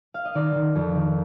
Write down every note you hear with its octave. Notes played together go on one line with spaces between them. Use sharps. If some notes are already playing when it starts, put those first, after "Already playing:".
F5
D#5
D#3 D5
D#3
F2
D#3